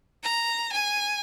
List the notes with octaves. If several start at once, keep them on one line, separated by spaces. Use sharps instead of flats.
A#5
G#5